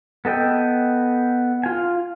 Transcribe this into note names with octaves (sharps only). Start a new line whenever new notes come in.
B3 A4 D#5 G5
F4 G#5